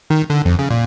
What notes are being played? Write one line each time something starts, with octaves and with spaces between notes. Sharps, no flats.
D#3
D3
F2
C#3
A#2